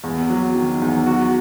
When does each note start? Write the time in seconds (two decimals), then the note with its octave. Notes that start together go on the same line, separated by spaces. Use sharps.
0.04 E2
0.30 F#3
0.56 D#3
0.82 E2
1.06 F#4